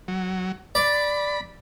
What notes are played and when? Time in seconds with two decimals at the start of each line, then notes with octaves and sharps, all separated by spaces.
0.08 F#3
0.75 D5 B5